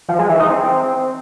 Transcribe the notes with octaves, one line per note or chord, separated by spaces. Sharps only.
F3
G#3
E3
D#4
C4